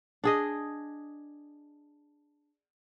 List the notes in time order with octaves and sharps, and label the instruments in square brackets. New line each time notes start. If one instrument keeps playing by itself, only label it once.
[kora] D4 G#4 D#5